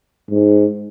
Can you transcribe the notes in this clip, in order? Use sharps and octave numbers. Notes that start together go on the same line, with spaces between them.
G#2